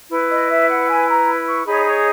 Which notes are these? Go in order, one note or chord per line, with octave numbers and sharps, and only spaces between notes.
E4 B4
D#5
E5
F#5
G#5
A#5
C#6
D#4 G#4 C#5 B5
C#5